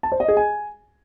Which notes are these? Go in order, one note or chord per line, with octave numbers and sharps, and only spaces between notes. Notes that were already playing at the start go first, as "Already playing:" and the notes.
A5
C5
D#5
G#4
G#5